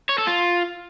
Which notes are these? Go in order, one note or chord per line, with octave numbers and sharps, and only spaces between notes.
C#5
A4
F4